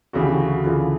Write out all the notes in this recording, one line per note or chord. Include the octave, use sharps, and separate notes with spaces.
D2 C#3 E3 F#4
G4
F#4
F#4
D2 C#3 E3 F4